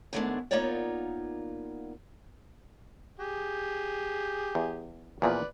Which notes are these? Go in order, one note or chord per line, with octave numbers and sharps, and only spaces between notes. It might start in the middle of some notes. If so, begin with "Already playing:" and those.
D#2 G#2 G#3 A3 B3 D4
A#3 B3 D#4 F4 C#5 D5
G4 G#4
E2
E2 A#2 F3 B4 D5